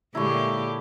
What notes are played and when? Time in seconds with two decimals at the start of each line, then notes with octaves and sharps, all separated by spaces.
0.15 A#2 D3 G#3 A#3 E4 G4 C#5